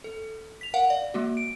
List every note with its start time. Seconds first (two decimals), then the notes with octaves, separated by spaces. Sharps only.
0.04 A4
0.61 B6 F7
0.74 A#4 F5 F#5
0.90 D5
1.14 G#3 A#3 F#4
1.37 D7